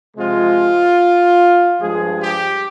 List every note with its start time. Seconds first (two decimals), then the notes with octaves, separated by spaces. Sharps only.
0.17 C3 F3 G#3 F4
1.80 G2 F3 G#3 G#4
2.21 G4